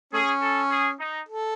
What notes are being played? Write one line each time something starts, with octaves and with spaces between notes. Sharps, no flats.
A3 C#4 G#4
A4
G#4
D#4
A4